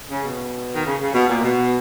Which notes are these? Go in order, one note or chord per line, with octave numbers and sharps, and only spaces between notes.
C#3
B2
D#3
C#3
C#3
B2
A#2
B2